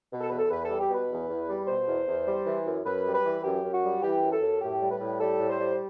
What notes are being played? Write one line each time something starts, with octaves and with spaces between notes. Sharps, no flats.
B2
A4
E2 B4
A4
E2 B4
G3 A4
G4
B2 B4
E2
E2
G3
B2 C5
E2
E2
G3
E3
F#2
F#2 B4
G3
B4
E3
F#2 G4
F#2
F#4
G3
E3 G4
F#2
A4
F#2
A2 G4
G3
B4
A2
G3 A4
A2
C5
G3